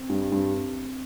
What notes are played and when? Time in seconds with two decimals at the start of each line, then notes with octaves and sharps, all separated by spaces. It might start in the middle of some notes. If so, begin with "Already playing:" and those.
Already playing: C4
0.10 G2
0.32 G2